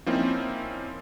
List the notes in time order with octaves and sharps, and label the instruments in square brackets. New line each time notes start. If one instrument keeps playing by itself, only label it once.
[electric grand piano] F3 A#3 C4 C#4 D#4 E4